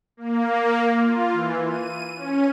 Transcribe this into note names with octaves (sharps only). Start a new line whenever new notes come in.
A#3
F4
E3
D#7
C#4